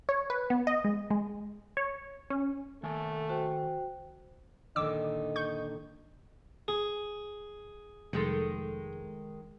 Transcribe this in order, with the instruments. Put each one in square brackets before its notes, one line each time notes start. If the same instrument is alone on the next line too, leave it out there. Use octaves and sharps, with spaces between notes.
[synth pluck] C#5
B4
B3
D#5
G#3
G#3
C#5
C#4
[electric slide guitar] D#3 A4 G#5 [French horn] A3
[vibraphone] F#4 C5 G5
[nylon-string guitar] A#2 D3 D#3 [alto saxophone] D#4 [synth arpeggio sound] D6 E6
[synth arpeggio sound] C#6 G6
[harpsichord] G#4
[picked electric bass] F1 [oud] D#3 G#3 A4